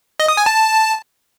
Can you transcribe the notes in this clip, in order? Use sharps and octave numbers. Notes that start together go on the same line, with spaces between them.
D#5
D#6
G#5
A5